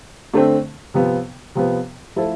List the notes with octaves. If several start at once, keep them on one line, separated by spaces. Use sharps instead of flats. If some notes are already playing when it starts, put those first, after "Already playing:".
D3 A3 C4
C3 F3 B3
C3 F3 B3
F3 A3 E4 A4 C5